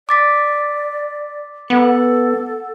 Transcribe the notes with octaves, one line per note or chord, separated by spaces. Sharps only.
D5 D6 A6 B6
B3 A4 F#5